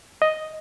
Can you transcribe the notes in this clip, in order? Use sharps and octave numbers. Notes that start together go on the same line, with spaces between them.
D#5